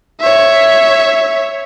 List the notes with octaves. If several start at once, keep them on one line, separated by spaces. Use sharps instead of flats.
C#5 E5